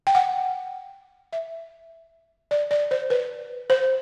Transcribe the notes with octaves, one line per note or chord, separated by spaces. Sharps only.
G5
F#5
E5
D5
D5
C5
B4
C5